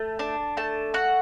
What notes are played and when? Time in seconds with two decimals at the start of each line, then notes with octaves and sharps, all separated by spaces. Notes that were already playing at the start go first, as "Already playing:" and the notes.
Already playing: A3
0.19 D4 A5
0.57 A3 A5
0.94 F#4 F#5